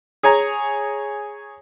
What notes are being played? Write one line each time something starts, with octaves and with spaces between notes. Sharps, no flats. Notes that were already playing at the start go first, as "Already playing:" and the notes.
G#4 C#5 G#5 A#5